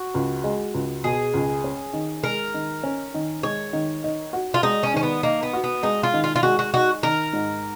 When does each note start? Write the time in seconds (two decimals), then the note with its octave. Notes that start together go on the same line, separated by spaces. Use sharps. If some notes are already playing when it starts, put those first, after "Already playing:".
Already playing: F#4
0.14 C#2
0.44 G#3
0.74 C#2
1.04 B2 G#4
1.34 C#2
1.64 C#4
1.93 D#3
2.24 G#3 A#4
2.54 D#3
2.83 C#4
3.14 D#3
3.43 G#3 C#5
3.73 D#3
4.04 D#4
4.33 F#4
4.54 F4
4.63 G#3 D#4
4.83 C#4
4.94 D#3 C#4
5.03 B3
5.23 A#3 D#4
5.43 B3
5.53 F#4
5.64 B3
5.83 G#3 D#4
6.03 F4
6.13 D#3
6.24 F4
6.36 F4
6.43 G#3 F#4
6.59 F#4
6.74 D#4 F#4
7.03 D#3 A#4
7.33 G#2